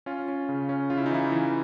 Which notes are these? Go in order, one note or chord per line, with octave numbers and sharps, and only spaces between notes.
C#4 F4
C#4
C#3
C#4
C#3 F4
E4
D#4
E3 E4
E3